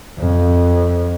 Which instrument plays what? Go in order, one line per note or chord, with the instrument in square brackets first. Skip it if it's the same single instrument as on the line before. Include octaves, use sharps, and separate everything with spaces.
[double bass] F2